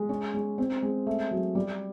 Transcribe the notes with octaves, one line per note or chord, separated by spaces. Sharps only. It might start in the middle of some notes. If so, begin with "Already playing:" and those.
Already playing: G#3
C#4
G#3
C4
G#3
A3
F#3
G3